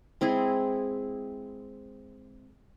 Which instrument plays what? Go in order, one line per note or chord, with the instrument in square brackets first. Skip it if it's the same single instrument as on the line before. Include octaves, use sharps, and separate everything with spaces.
[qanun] G#3 C4 E4 G#4